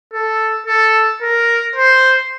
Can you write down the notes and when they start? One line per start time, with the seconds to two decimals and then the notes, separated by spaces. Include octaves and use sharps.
0.14 A4
0.67 A4
1.22 A#4
1.76 C5